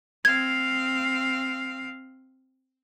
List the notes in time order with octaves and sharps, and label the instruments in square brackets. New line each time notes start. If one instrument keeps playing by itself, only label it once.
[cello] C4 F5 [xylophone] G#6